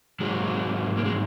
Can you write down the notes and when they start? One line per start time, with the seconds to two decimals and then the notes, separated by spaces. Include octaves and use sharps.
0.20 G#2 D#3 F#3 G#3
0.97 A#3
1.05 G#3